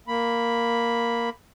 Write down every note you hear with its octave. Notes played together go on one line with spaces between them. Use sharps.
A#3 B5